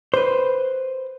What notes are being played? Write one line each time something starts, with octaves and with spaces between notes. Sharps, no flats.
B4 C5